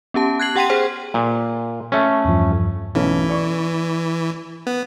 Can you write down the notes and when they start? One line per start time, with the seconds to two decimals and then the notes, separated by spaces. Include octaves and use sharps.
0.14 B3 C#4 G4 A5
0.40 F#6 G#6 C7 F#7
0.56 G4 F#5 G5 C6 B6 D#7
0.70 G#4 C5 G5
1.14 A#2
1.92 A3 C#4
2.25 E2 G2 F3
2.95 B1 E3 A3 C#4
3.29 D5 C#6
4.67 B3